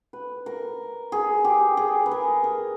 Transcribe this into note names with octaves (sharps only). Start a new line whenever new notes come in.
B4
A#4
G#4
G4
G#4
B4
A#4
A#4